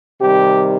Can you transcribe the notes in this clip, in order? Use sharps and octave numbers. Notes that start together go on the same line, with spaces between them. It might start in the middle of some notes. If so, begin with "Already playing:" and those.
C3 D#3 G3 G4